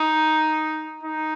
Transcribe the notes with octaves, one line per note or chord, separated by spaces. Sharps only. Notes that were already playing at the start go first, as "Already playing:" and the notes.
Already playing: D#4
D#4